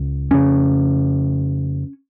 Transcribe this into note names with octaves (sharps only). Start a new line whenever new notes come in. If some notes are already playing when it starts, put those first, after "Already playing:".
Already playing: C#2 C#3
F2 C#3 C#4